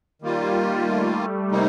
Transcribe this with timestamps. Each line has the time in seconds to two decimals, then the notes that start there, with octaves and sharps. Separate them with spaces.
0.22 D#3 G3 A#3 F4
0.87 A3
1.51 C3 G3 A#3 D#4